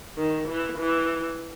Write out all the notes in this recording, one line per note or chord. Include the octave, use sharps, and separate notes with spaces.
D#3
E3
E3